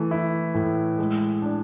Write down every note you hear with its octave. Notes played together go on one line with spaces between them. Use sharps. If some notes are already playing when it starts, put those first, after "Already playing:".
Already playing: E3 A3
E4
A2
G#3
D4